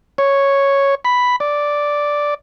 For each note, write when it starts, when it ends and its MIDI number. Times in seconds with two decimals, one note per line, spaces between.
0.18 0.95 73
1.05 1.36 83
1.40 2.34 74